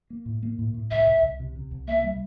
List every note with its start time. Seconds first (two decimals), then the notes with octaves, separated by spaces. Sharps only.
0.10 A#3
0.26 A2
0.43 A#3
0.59 A2
0.74 A2
0.91 C2 E5
1.07 C2
1.22 C2
1.40 C3
1.56 C3
1.71 C2
1.88 A#3 E5
2.04 G3